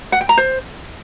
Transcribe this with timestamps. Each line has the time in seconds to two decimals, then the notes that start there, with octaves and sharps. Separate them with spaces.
0.12 F#5
0.21 G5
0.29 A#5
0.37 C5